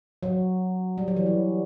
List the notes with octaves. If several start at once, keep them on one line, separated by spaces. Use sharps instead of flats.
F#3
G3
F#3
E3
F#3